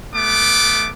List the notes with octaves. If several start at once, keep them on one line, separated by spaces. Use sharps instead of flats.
A3 B3 D6